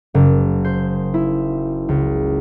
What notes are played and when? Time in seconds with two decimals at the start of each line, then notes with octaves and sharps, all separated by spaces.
0.14 F#1
0.65 C5
1.14 E4
1.89 C#2